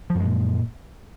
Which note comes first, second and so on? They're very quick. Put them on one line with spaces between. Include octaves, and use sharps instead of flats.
F3 F#2 G#3 A#2